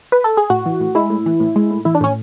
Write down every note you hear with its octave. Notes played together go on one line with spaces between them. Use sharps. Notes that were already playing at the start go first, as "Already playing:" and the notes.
B4
A4
G#4
A2 F#4
E3
A2
G#3 E4
A2
E3
A2
G#3
A2
E3 E4
D4
A2 C#4